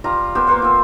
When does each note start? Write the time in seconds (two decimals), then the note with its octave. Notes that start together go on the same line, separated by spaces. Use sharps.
0.04 G3 F4 A#5
0.35 B3 G4 A#4 C5
0.47 A#3 A#4 C5 F#5
0.62 C4 F4